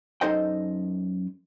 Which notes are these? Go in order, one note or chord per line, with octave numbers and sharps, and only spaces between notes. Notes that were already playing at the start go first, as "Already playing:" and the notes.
F#2 D#4 A4 C5 D#5 G5